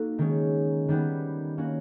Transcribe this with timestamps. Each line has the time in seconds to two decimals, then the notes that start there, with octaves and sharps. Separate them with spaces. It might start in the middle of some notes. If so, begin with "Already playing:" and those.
Already playing: A#3 D#4 F#4 A4
0.18 D#3 G#3 C#4
0.88 D#3 G3 B3
1.58 A#3 C#4 F#4